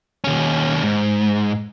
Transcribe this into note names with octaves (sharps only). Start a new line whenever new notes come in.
D#2 C#4
G#2